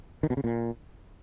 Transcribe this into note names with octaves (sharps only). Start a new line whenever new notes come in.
D#3
B2
C#3
A#2